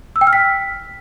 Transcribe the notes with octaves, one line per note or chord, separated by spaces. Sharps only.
E6
G5
F6
B6